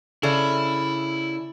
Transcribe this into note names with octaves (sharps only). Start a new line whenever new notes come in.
C#3 E4 A4 D5